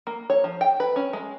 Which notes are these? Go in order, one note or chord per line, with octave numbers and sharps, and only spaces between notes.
A#3
C#5
F3
G5
B4
C#4
G#3